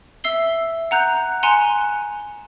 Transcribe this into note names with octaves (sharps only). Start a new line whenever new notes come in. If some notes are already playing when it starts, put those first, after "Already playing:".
E5 E6 C7 G7
F#5 A#5 F#6 G6
G#5 A#5 C6 F#6 C#7 E7